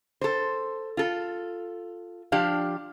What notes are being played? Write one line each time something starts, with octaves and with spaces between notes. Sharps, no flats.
A4 C5
F4 A4
F3 D4 G4 F5